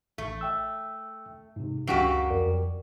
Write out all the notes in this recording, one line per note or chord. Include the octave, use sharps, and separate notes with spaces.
A1 A3
E5 G5 E6
G#2 C3
C#2 F#2 F#4 G4 F5 C7
F2 A#4 D5